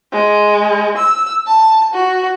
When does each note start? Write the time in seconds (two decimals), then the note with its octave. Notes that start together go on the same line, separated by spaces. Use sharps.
0.12 G#3
0.97 E6
1.47 A5
1.94 F#4